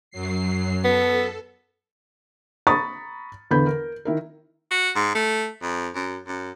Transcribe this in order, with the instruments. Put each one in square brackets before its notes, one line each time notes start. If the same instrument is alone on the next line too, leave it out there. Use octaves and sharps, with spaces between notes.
[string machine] F#2 F#3 C7
[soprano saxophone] B3 [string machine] A4
[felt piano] A#5 B5 C#6 D#6 A6
E2 D3 B4 B5 G6
A#4
D#3 E4 A#4
[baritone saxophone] F#4
G#2
A3
F2
F#2
F#2